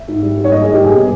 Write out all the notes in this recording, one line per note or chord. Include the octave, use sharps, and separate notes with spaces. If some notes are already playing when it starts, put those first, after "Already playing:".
Already playing: E5
G#2
G3
G#2
C#5
A#3 D#5
G#2 G#4
G4
G3 G#4
B2